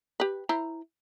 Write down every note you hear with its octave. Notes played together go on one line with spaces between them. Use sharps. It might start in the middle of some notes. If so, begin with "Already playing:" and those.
G4 B4
E4 C5 A#5